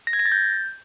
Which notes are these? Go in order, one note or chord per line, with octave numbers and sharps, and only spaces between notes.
A#6
G#6
A#6
A6
G6